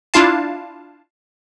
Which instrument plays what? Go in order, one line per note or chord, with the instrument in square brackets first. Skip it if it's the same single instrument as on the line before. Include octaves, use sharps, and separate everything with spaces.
[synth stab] D4 E4 F4 F5 A5